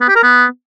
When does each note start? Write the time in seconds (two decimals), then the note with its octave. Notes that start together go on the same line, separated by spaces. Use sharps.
0.01 B3
0.08 G4
0.16 A#4
0.23 B3